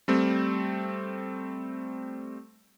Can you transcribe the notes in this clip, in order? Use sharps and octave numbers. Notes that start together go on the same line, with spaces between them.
G3 A3 C4